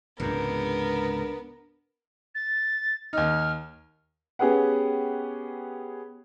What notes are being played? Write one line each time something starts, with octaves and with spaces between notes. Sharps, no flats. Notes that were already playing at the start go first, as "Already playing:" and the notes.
C#2 G#2 C3 B3 D4 A#4
A6
D#2 D#4 F6
B3 C#4 G4 G#4 B4 F#5